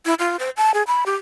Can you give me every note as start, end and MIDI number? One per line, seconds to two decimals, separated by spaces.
0.06 0.14 64
0.19 0.37 65
0.39 0.50 72
0.57 0.72 81
0.74 0.83 68
0.87 1.04 83
1.06 1.15 67